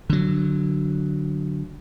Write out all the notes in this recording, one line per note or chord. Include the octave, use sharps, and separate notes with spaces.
D3 F#3